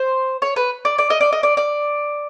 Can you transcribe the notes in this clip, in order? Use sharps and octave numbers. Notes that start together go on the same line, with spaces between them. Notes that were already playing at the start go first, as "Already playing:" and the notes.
Already playing: C5
C#5
B4
D5
D5
D#5
D5
D#5
D5
D5